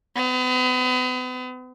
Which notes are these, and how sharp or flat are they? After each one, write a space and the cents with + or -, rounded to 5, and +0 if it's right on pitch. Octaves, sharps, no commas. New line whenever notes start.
B3 +40